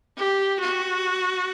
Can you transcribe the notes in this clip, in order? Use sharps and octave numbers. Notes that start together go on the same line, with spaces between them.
G4
F#4